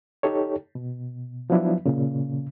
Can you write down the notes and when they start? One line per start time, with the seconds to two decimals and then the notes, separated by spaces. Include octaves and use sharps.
0.23 D#4 G4 A4 C#5
0.75 B2
1.50 F3 F#3 B3 D4 E4
1.86 A#2 C#3